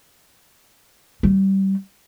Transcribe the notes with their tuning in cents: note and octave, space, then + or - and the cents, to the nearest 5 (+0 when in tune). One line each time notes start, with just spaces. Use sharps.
G3 -25